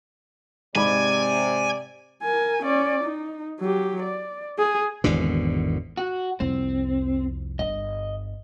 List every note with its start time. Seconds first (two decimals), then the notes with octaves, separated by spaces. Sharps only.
0.75 G#2 C3 D5 G#5 B5
2.23 A#4 G#5
2.63 C#4 D5
3.05 D#4
3.60 F#3 G4
4.03 D5
4.58 G#4
5.04 G#1 E2 B2 D3
5.97 F#4
6.40 C2 F2 C4
7.59 G1 D#5